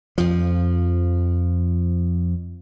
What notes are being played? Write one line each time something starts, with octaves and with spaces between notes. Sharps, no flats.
F2 F3